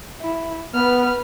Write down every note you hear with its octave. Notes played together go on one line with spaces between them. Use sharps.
E4
B3 B4 F6